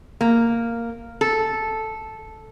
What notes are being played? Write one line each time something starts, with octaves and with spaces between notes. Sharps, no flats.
A#3
A4